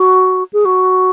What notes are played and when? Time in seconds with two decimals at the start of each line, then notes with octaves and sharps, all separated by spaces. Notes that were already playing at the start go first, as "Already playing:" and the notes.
Already playing: F#4
0.53 G#4
0.65 F#4